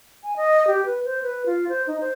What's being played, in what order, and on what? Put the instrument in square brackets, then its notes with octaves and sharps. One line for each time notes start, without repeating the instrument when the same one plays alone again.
[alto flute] G#5
D#5
G4
B4
C5
B4
F4
C5
D#4
C5